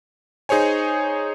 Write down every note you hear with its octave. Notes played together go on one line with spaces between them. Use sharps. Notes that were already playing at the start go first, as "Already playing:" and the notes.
D#4 G#4 C5 C#5 G#5